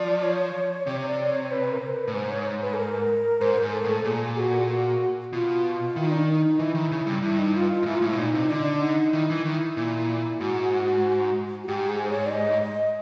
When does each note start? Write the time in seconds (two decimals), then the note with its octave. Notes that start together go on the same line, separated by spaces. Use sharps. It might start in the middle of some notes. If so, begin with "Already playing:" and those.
Already playing: F3 D5
0.23 C#5
0.87 C3 C#5
1.08 D5
1.30 C#5
1.51 B4
1.72 A#4
1.87 C5
1.93 B4
2.08 A2
2.14 G#2 C5
2.30 C#5
2.62 B4
2.73 A4
2.77 A#4
3.41 G#2 C5
3.58 G#2 A#4
3.73 A4
3.84 A2 A4
4.04 A#2 G#4
4.37 F#4
4.68 F#4
5.32 B2 F4
5.96 D#3 E4
6.04 D#4
6.10 D4
6.18 D#4
6.59 E3 E4
6.75 D#3
6.91 C#3
7.06 G2
7.22 G2 E4
7.39 D#4
7.55 F4
7.70 F4
7.82 G2
7.86 G#2 E4
7.96 F4
8.02 A2 E4
8.12 B2
8.18 A#2 D#4
8.34 C3
8.50 D3 D4
8.81 D#4
9.13 D#3 E4
9.30 E3
9.45 D#3
9.77 A#2
10.40 G#2 F#4
11.64 F#4
11.67 G#2 G4
11.89 G#4
12.06 C5
12.10 C#5
12.26 D5
12.31 D#5
12.62 D#5